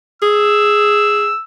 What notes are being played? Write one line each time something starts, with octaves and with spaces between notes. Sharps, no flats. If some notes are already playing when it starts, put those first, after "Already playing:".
G#4 E6